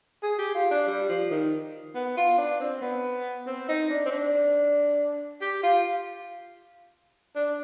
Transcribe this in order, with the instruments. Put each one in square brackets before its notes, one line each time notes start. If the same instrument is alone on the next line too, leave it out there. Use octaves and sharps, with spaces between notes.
[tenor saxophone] G#4
G4
F4
D4
G3
F3
D#3
B3
F4
D4
C4
B3
C4
D#4
D4
C4
D4
G4
F4
D4